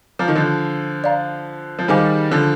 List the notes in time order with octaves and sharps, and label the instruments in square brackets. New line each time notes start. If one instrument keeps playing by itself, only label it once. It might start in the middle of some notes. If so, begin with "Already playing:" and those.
[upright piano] F3 [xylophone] F5 A#5 D6 F6
[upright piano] D#3
D3 F3
[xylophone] D5 F5 A#5
[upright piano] F3
[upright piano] D#3 G3 [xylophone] G#4 C5 F5 G#5 D6
[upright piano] D3 F3